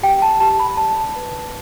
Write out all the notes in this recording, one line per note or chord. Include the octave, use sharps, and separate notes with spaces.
G4 G5
A5
G4 A5
B5
D5 A5
B4